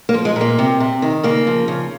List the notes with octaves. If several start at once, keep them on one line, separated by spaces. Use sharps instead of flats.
A#3
F3
G#3
A#2 A#3
C3
C3
D#3
C#3 A#3
F3
C#3